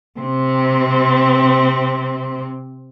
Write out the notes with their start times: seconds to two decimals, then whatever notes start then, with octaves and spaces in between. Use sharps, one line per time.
0.20 C3 C4